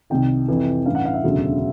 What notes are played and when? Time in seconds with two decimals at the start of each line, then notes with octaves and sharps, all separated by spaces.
0.10 C2 C3 D#3 G5
0.48 F2 C3 E3
0.85 A1 G2 E3 F5
0.95 F#5
1.05 F5
1.14 E5
1.24 E1 D2 C#3 F#3